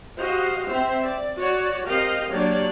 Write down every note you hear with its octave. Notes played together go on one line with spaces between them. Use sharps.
F#4 G4 C5 D#5 F5
C4 C5 E5
D5
F#4 C#5 D5
C4 G4 A#4 D#5 F5
F#3 A#3 D4 G4 C#5 D5